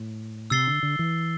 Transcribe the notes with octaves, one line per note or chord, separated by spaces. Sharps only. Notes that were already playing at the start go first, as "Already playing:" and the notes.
Already playing: A2
C3 E6 A6 C7 G7
D3
D3
E3